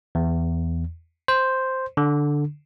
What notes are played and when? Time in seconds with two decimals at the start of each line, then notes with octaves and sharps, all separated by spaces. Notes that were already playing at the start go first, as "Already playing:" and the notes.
0.15 E2
1.28 C5
1.97 D3